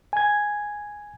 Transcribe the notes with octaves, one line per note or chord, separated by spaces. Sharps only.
G#5 G#6